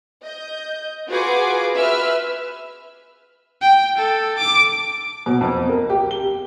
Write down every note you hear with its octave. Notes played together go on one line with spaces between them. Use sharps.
D#5 G6
F4 F#4 G#4 B4 G#5 D6
B4 E5 E6 F6
G5
A4
D6
B2
F2
A#4
G4
G7